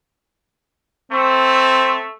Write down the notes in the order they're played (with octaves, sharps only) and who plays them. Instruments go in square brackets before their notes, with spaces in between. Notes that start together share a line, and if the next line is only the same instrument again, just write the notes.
[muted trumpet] A3 [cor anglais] C4